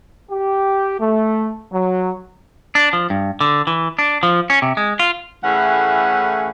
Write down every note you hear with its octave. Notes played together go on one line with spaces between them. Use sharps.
G4
A3
F#3
D4
F3
G2
D3
E3
D4
F3
C#4
C3
G#3
F4
A2 E3 A3 C#4 G#4 F#5